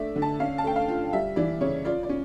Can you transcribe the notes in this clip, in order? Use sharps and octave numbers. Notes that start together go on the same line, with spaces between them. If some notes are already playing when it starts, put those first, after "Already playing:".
Already playing: A3 D4 D5 E5
D3
A5
C#4 F5
A5
A3 G5
F5
F4
G3 E5
E3 D5
C#3 C#5
F4 D5
D5
C#4